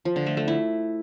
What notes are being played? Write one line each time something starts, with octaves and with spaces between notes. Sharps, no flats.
F3
D3
A3
A3
E4